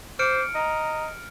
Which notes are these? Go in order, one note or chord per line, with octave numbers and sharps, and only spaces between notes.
C5 D6 F6 C#7 D7
D#5 A#5